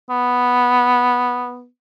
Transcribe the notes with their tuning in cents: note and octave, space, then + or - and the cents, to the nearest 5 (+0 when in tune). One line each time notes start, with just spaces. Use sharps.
B3 -5